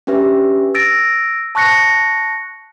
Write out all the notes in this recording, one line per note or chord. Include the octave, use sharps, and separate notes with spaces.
C#4 D4 G4 B4 E5
E6 A6 A#6 D7
A5 C#6 F#6 A#6 C#7